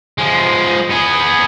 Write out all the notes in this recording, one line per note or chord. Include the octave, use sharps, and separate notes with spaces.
F3 G#3
B3 G#4